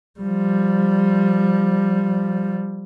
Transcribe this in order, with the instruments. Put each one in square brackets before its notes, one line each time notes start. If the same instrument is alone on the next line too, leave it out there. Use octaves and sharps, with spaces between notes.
[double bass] F3 G3